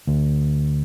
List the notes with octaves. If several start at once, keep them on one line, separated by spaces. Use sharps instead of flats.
D2